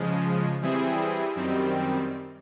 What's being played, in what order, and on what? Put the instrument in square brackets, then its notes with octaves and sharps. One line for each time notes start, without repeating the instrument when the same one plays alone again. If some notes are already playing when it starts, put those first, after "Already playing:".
Already playing: [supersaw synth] C#3 F3 G#3
E3 G3 C4 E4 G#4
F#2 D#3 G3 C4